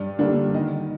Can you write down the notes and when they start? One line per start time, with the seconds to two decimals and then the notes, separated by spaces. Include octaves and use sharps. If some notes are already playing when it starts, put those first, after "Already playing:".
Already playing: G2 D5
0.19 D3 G3 A#3 D4
0.54 D#3 D#5